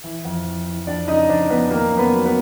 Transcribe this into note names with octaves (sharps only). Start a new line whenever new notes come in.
E3
F2
E3
E3
F2 D4 D5
C#3 D#4 D#5
F2 D4 D5
F2 B3 B4
D#3 A#3 A#4
F#2
B3 B4
F#3
B3 B4